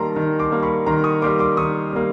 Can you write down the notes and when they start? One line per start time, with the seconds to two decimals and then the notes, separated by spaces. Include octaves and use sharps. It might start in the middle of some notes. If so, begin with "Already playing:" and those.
Already playing: D#3 G3 A#3 A5 A#5 C6
0.16 D#3
0.39 C6 D6
0.51 G3 A#3
0.63 B5 C#6
0.86 D#3 A#5 C6
1.04 C#6 D#6
1.22 G3 A#3 C6 D6
1.39 C6 D6
1.57 D#3 C#6 D#6
1.93 G3 A#3